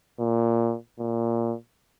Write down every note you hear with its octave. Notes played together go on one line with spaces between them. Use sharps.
A#2
A#2